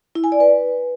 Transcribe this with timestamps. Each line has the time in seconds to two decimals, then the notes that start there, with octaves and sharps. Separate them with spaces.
0.15 E4
0.24 G#5
0.32 D5
0.40 B4